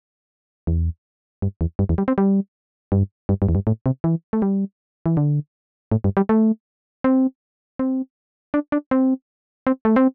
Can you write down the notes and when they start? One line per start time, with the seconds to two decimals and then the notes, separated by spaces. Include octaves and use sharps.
0.67 E2
1.42 G2
1.61 E2
1.79 G2
1.89 E2
1.98 G3
2.08 C4
2.18 G3
2.92 G2
3.29 G2
3.42 G2
3.49 E2
3.55 G2
3.67 A2
3.86 C3
4.04 E3
4.33 A3
4.42 G3
5.06 E3
5.17 D3
5.92 A2
6.04 G2
6.17 G3
6.29 A3
7.04 C4
7.79 C4
8.54 D4
8.72 D4
8.91 C4
9.67 C4
9.85 A3
9.96 C4